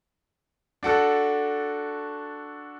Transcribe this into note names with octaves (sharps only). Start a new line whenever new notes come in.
D4 F#4 A4 F#6